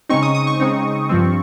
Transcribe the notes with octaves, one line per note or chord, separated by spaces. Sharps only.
C#3 G#3 C4 D#4 C#6
D#6
D#6
C#6
C#3 G#3 C4 D#4
G2 F3 C4